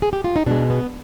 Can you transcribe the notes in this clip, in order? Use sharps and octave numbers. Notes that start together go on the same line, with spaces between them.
G#4
G4
F4
D#4
B2 G#3 D4
B3